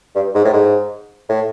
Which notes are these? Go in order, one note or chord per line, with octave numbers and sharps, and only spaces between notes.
G2
G#2
A2
G#2
A2